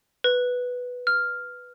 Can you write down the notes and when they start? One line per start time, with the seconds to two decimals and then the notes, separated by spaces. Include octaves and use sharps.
0.24 B4
1.07 F6